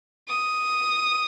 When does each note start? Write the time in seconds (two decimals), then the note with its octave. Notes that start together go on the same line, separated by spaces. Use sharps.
0.28 D#6